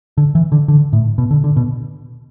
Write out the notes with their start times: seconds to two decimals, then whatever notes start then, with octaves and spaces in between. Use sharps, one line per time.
0.18 D3
0.35 E3
0.52 D3
0.68 D3
0.93 A2
1.18 B2
1.31 D3
1.44 D3
1.57 B2